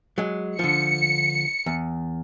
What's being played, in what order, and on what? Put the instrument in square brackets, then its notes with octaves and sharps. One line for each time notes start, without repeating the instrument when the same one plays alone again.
[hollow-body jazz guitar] F#3 G#3
[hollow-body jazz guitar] D3 F3 [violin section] C#7
[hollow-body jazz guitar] E2